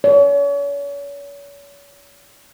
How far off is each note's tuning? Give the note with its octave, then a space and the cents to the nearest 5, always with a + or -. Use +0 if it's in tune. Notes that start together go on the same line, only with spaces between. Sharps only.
C#5 +40